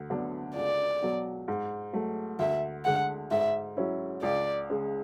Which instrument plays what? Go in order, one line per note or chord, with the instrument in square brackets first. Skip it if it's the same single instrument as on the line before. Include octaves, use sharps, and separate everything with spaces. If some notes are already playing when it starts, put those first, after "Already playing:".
Already playing: [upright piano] D2
D3 F#3 B3 D4
[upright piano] C#2 [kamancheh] D5
[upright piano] B2 F#3
G#2
F#3 A3
[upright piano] D2 [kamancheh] E5
[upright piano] D3 G#3 [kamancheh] F#5
[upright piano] G#2 [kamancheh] E5
[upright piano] F#3 C#4 E4
[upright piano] C#2 [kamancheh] D5
[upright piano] C#3 G#3